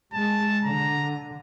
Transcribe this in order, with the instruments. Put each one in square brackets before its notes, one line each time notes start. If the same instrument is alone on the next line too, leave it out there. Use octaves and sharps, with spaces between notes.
[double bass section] G#3 [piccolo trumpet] A5
[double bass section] D3 [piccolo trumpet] A#5